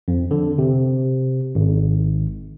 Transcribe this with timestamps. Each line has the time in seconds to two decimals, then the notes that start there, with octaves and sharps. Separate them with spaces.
0.08 F2
0.31 D3
0.58 C3
1.55 G#1